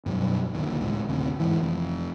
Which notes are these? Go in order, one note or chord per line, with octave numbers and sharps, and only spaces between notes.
F#2 B2 F#3 G3
A#1 D#2 A#2 D3
F1 C#2 A2 G#3
F#1 D2 C3
E2 G#2 E3
F1 F2